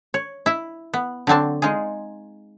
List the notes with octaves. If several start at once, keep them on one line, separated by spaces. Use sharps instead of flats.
C#5
E4 E5
B3
D3 F#3 C4 D4 A5
G#3 D#4 F4 G#4